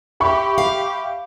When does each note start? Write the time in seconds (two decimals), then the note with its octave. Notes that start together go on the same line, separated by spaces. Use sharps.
0.20 G4 E5 B5 C#6
0.58 F5